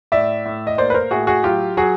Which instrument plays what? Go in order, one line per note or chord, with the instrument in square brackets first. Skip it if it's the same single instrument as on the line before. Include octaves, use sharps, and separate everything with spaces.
[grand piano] A2 D5 E5
A2
D#5
A#3 C5 D5
B4
A#4 C5
A2 F#4 G#4
F#4 G#4
F#3 F4 G4
F#3 F#4 G#4